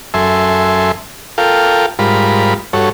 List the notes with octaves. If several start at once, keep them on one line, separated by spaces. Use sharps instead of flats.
F#2 A4 E5 G#5 C6
F4 A4 A#4 F5 G5
G#2 G3 F4 A#4 B5
G2 F#4 A4 C#5